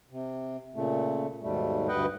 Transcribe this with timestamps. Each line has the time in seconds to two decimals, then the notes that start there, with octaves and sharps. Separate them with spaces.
0.10 C3
0.75 A#2 C#3 A3
1.42 D#2 G#2 B2 G3 A3
1.88 D2 G2 B4 D#5 F#5 G5